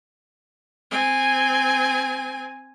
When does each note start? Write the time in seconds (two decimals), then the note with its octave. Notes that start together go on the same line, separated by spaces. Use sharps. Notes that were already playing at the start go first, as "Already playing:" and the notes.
0.90 C4 G#5